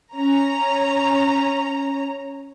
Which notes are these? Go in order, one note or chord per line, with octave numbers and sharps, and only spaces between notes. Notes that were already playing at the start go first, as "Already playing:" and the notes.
C#4 A#5